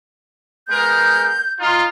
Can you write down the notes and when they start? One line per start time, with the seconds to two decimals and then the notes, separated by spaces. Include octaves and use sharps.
0.68 G#3 B3 A#4 G6
1.59 D#4 F4